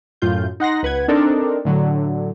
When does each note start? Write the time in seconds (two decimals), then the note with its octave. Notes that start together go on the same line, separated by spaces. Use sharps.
0.22 F#2 A2 F4 G6
0.60 D#4 F#5 C6 A#6
0.83 C#2 B4 F#5 G#6
1.08 C4 D4 D#4 A4 A#4
1.65 A2 D3 F#3